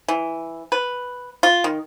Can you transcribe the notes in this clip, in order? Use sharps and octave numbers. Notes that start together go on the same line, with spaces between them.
E3
B4
F4
D#3